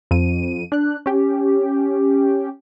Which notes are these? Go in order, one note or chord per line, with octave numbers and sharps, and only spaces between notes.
F2 D#7
D4 F#6
C#4 G4